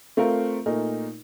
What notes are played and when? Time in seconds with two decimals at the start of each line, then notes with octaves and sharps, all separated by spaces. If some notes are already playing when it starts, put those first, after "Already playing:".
0.17 A3 C4 F4 A#4
0.66 A#2 A3 D#4 A#4